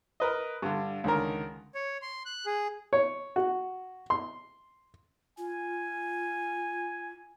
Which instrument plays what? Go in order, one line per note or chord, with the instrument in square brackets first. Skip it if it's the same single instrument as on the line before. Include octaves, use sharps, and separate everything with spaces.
[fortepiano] A#4 B4 D#5
G2 D3
C#2 D3 D#3 A#4
[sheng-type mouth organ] C#5
C6
F#6
G#4
[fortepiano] C#5
F#4
C6
[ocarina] F4 [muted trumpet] G#5